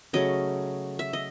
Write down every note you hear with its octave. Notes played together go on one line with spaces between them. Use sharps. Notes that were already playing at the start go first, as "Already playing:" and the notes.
C#3 F#3 A3 D#5
E5
D#5